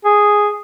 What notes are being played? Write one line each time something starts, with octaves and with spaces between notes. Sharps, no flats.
G#4